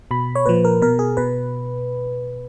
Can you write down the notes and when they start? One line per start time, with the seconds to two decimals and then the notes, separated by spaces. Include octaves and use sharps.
0.11 B2 B5
0.35 C#5
0.46 A#2 F3 B4
0.65 A#4
0.82 B2 A#4
0.99 G#4
1.17 B2 B4